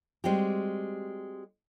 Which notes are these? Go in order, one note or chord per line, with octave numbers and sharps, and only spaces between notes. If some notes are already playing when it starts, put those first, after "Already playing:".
G3 G#3 C4 F#4 G4